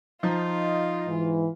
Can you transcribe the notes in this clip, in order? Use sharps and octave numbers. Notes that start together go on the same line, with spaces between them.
F3 D#4 F4
G#2 E3